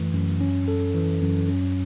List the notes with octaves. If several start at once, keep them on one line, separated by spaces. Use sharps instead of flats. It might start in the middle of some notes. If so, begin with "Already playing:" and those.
Already playing: F#2 E3 A3
F#2
C#4
A4
E3
F#2
C#4